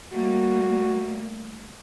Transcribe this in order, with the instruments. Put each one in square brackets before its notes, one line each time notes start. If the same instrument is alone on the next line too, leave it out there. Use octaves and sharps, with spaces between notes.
[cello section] G3 A3 A#3 [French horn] F#4